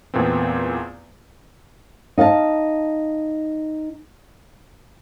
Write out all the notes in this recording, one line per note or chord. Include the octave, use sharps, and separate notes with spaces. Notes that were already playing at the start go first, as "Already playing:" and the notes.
E2 A#2 A3 B3 C4
D#4 F5 F#5 A5